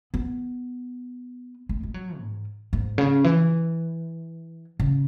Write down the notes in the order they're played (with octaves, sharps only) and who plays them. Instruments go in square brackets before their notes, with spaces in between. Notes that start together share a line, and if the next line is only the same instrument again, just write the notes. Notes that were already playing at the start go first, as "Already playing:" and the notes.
[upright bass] B3
G#3
G#3
F#3
G#2
G#2
C#3
E3
C#3